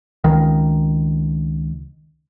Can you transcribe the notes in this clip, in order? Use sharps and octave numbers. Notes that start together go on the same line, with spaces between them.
C#2 D#3